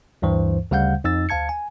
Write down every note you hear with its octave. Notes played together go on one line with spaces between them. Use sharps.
D2 G2 E3 C5
D2 C#3 G3 F5 F#5 G6
F2 D#4 E6 A6
D2 F5 A5 G#6 C#7
G#5